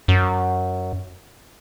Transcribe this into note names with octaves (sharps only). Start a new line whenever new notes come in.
F#2